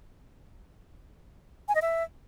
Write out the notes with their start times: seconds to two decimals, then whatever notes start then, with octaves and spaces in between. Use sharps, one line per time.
1.68 G#5
1.75 D#5
1.82 E5